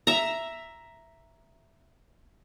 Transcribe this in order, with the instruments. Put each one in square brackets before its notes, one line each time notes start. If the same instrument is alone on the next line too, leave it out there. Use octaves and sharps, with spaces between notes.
[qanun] E5 A#5